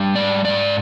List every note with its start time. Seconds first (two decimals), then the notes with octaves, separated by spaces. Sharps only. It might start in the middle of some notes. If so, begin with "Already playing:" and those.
Already playing: G3 D4
0.15 G#2 D5
0.44 G#2 D5